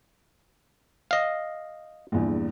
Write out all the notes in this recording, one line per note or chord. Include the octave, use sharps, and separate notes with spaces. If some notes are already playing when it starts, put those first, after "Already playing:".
D#5 F5
A#1 E2 G2